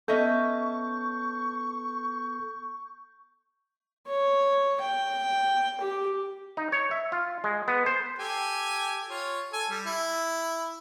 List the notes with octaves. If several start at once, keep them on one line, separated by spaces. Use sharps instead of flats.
B3 C#4 A4 D#5 E5 C#6 G6
C#5
G5
G4
D#4
C#5
E5
F4
G#3
B3
C5
G4 A4 G#5
F4 C#5
A4 G#5
G3
E4